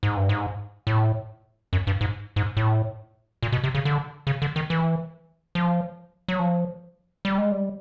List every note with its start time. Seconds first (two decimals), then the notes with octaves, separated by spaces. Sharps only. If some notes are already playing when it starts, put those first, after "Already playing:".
0.03 G#2
0.17 G2
0.29 G#2
0.87 A2
1.73 F#2
1.87 G2
2.01 G#2
2.36 G#2
2.57 A2
3.43 A#2
3.52 B2
3.64 C3
3.75 C#3
3.85 D3
4.27 C#3
4.42 D3
4.56 D#3
4.70 E3
5.55 F3
6.28 F#3
6.39 F3
7.25 G3
7.38 G#3
7.52 G3